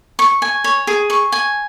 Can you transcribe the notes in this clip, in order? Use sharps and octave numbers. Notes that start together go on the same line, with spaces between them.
C#6
G#5
C#5
G#4
C#6
G#5